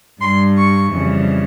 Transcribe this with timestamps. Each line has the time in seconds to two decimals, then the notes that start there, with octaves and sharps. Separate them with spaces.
0.21 G2 G3 C6
0.57 C#6
0.93 F2 C#3 E3 G3